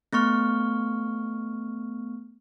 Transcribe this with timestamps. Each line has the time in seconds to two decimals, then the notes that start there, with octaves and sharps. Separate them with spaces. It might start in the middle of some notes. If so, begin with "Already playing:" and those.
0.13 A3 B3 C#6 F6